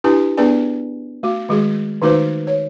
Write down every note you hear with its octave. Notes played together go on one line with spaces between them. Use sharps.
D4 E4 G4 B4 G#5
B3 D4 G#4 B4 D5 G#5
A3 F#4
D#3 G#3 F#4 G#4
D#3 A3 D#4 F#4 B4 C5
C#5